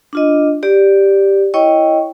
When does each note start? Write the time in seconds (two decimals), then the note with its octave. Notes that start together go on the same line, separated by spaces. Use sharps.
0.13 D4 F4 D#5
0.63 G4 D5
1.54 E4 C#5 D#5 G5 C#6